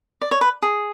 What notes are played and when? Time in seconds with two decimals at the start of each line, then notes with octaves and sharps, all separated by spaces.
0.21 D5
0.31 C#5
0.41 B4
0.62 G#4